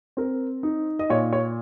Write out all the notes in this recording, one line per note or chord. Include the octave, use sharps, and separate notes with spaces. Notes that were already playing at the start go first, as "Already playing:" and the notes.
C4 A#4
D#4
D#5
A#2 C#5
C#5